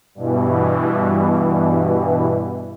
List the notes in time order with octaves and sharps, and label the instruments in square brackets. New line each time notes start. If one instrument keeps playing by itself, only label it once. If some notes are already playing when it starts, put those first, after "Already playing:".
[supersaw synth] G2 B2 E3